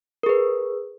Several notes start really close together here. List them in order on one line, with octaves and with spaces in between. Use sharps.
A#4 G#4 B4